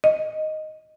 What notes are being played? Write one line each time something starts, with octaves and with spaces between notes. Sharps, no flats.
D#5